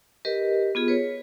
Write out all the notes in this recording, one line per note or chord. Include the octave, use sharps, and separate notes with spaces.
G4 A#4 B4 D#5
B3 F4 G#4
B4 C#5